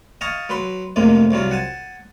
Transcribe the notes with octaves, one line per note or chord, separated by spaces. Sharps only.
D#5 F5 G#5 A5 C#6 D#6
F#3 B4 C6
F2 A2 C3 G#3 A#3
C2 C3 F#3 F4
F#5 G#5 A5